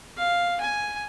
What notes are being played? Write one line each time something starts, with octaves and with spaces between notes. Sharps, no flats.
F5
G#5